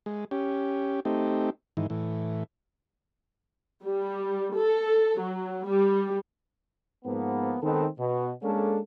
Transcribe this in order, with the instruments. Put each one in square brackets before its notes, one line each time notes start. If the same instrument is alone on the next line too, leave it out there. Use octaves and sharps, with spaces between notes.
[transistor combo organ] G#3
C#4 G4
A3 C4 D#4 G4
G#2 D#3 E3
A2 E3
[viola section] G3
A4
F#3
G3
[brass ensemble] G#2 F3 A#3 B3
D#3 G#3 B3 C4 D#4 A4
B2
G#3 A#3 C#4 D4 A4